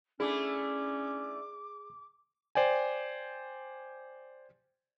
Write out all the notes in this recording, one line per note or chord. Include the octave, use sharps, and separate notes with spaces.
A3 C#4 D4 E4 G#4 D6
C5 D5 G5 G#5